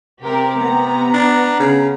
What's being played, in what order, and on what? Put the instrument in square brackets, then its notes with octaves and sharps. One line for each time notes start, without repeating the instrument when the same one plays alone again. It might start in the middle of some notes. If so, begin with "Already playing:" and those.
[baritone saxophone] C3 [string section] C4 G4 A#4
[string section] B3 A#5
[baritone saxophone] D4
C#3